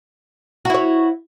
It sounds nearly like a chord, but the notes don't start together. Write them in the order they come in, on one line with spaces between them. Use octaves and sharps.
F#4 E4 C#5